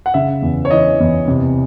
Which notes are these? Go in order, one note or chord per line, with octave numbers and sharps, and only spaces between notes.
F#5
C#3 E5
E2
C#5
E3 D#5
E2
C3